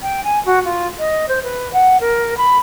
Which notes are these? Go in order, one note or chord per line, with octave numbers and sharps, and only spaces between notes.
G5
G#5
F#4
F4
D#5
C5
B4
F#5
A#4
B5